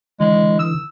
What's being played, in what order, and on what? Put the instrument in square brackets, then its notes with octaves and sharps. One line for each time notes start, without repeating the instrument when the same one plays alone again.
[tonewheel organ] D3 E3 [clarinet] G#3
[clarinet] E6